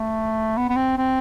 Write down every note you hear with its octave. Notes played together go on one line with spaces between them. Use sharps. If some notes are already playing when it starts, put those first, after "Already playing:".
Already playing: A3
B3
B3
C4
C4